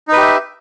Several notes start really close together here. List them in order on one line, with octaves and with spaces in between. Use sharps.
D#4 B4 G4 E5